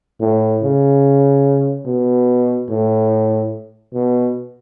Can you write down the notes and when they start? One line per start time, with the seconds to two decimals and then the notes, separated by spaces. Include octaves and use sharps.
0.20 A2
0.63 C#3
1.86 B2
2.69 A2
3.94 B2